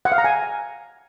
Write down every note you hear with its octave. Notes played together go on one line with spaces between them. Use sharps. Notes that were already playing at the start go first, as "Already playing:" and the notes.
F#5
F5
A#5
G#5